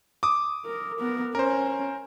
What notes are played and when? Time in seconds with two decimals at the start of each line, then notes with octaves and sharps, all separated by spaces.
0.23 D6 D#6
0.65 A#4
1.00 B3 A#4
1.35 C#4 A#4 C5